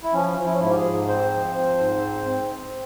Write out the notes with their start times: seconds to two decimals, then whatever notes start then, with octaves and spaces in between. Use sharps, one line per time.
0.03 E4
0.13 F3 C#4
0.37 F3
0.45 E4
0.52 C#4
0.60 G#2 E4
0.71 G4
0.76 G#4
0.84 G#2
1.08 C4 C5
1.31 F3
1.54 C4
1.78 G#2
2.01 C4
2.25 C4
2.49 C4